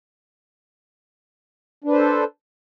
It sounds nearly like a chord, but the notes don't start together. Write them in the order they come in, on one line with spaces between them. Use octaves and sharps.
D4 B4 C5 A4